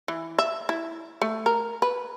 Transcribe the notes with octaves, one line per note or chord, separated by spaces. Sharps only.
E3
E5
E4
A3
A#4
B4